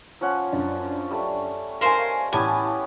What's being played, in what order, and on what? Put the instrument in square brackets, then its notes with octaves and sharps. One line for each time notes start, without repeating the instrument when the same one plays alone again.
[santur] F3 C#4 F#5
[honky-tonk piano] F#2 D4
[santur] G3 A3
[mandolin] A#4 C5 [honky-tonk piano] F5 G#5
[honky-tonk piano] A1 A5 B5 [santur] B3 C#4 G4 [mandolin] G#5